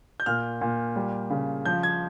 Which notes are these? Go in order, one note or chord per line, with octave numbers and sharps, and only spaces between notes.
G6
A#2 F6
A#2
G3
C#3
F3 G6
G#6